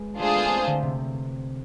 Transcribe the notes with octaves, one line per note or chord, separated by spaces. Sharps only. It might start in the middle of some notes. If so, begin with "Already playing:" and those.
Already playing: G#3 B3
A3 D4 F4 G#4 C5
B3
B3 C4
D3
C3